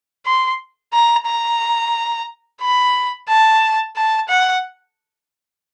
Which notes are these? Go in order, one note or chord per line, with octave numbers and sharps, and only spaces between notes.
C6
A#5
A#5
B5
A5
A5
F#5